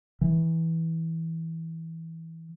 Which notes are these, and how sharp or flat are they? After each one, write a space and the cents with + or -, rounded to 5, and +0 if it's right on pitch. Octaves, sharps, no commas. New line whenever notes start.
E3 -15